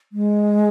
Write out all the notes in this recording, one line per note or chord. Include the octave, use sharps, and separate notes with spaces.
G#3